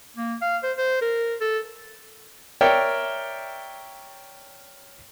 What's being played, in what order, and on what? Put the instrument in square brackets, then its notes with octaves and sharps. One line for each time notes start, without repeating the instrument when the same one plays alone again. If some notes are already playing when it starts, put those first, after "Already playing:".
[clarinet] A#3
F5
C5
C5
A#4
A4
[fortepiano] A#4 C#5 D5 E5 G5